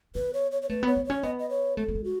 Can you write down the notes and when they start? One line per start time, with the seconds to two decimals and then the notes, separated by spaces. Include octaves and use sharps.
0.15 B3 B4
0.34 C#5
0.51 C#5
0.62 C#5
0.70 A3 B4
0.83 B3 C#5
0.96 B3
1.05 C#4 C#5
1.23 B3 D#5
1.39 D#5
1.50 C#5
1.77 A3 A4
1.88 A3
1.95 G#3
2.04 F#4